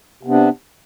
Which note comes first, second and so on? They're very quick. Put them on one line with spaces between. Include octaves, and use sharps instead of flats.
C3 B3 D4